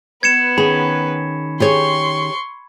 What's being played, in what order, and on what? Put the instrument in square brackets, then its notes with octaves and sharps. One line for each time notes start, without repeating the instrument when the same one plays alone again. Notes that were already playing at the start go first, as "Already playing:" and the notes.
[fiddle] B3 B4 [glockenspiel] G#6 C#7 E7
[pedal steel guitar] D#3 C#4 [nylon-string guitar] G#4 [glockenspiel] B5
[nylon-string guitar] G4 G#4 C#5 [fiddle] C6 C#6